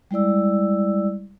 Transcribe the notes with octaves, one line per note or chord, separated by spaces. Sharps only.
G3 G#3 E4 D5 E6